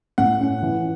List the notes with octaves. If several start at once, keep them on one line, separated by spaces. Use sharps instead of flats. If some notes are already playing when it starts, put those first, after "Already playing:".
A2 F#5
C#4
E3